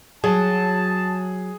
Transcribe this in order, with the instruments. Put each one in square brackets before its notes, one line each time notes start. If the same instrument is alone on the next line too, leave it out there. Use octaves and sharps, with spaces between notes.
[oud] F#3 [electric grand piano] G#4 [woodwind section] A5